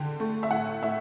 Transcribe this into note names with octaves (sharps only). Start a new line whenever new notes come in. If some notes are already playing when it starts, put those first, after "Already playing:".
Already playing: D3 G5
A3
E5
A2 F#5
A2 E5